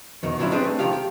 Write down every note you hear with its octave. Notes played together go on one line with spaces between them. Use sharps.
E2 B2 D#3
D2 F3 F#3 C#4 D4 E4
G3 C4 D4 G#4 B4 C5
A3
C2 C3 D#3 F3 G4 F5
G4